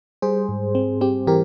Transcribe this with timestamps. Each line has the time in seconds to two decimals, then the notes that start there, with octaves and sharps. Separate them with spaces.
0.22 G3 G#4 C5
0.49 G#2
0.75 C4
1.01 C4 G4
1.27 E3 G4 A#4